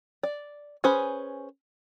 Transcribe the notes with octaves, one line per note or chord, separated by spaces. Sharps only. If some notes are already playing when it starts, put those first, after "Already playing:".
D5
C#4 G#4 B4 C5